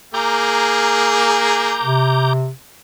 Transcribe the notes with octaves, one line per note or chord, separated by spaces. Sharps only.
A#3 G#4 A#5 D6 G6
C3